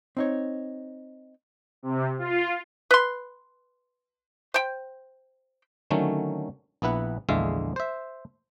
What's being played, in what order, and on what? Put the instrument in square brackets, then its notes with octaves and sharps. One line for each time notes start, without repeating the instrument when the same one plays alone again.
[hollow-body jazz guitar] C4 D#4 C#5
[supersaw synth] C3
F4
[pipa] B4 C6
C5 G5
[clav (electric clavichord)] D3 D#3 F#3 A3 C#4
A#1 B3 E4 B4 F#5
A#1 E2 D3 G#3 E5 F5
C5 E5